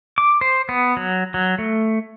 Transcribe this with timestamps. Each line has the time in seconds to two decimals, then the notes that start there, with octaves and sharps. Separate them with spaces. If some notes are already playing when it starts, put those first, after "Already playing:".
0.18 D6
0.41 C5
0.69 B3
0.97 F#3
1.34 F#3
1.58 A3